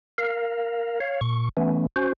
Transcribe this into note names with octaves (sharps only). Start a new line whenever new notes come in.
A#4 F5
C#5 F5
A#2 C#6
E3 A3 B3 C#4
C#4 F#4 C5